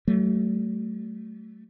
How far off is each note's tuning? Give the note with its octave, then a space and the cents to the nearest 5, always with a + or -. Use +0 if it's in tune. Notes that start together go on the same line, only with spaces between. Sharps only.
F#3 +45 A3 +0